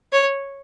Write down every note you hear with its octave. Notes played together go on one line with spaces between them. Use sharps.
C#5